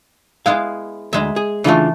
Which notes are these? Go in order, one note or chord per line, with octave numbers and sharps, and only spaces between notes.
G#3 B3 E4 F5
D2 G#3 E5
G#4
C#3 E3 A3 D4 F4